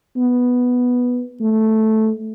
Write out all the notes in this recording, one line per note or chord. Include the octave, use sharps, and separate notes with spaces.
B3
A3